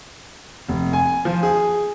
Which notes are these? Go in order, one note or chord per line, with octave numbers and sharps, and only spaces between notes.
F1
G#5
F3
G#4